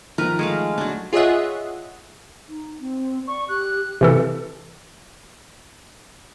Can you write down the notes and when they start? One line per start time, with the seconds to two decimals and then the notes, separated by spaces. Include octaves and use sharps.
0.18 D#3 F3 A#4 B4 F6
0.39 G#3 A3 F5
0.78 F#3 D4
1.13 F4 G#4 C#5 D#5 E5 F#5
2.49 D#4
2.81 C4
3.27 D5 C#6
3.48 G4 F#6
4.01 C3 E3 A4